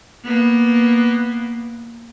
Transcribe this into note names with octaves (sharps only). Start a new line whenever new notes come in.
A#3 B3